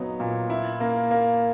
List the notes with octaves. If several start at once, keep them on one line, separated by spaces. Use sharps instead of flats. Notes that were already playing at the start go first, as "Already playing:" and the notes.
Already playing: A#2 F#3 B3 D#4
A#2
E4
A#3
A#3